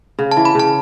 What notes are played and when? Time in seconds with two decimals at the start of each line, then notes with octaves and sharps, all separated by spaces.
0.19 C#3
0.31 A5
0.37 E3
0.45 B5
0.55 C#3 A5